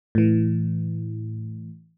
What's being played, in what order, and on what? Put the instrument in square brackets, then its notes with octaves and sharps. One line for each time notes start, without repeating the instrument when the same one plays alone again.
[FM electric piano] A2 E3